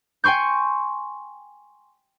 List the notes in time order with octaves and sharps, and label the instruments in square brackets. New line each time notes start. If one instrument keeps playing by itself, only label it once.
[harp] G5 G#5 C6 C#6 G6